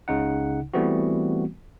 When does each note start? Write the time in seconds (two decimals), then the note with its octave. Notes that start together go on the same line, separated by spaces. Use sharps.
0.08 C#2 C#3 D#4 F#5
0.74 E3 G3 A3 B3 C4 F#4